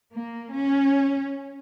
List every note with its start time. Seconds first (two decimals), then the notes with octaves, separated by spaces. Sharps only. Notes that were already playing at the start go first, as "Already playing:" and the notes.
0.12 A#3
0.54 C#4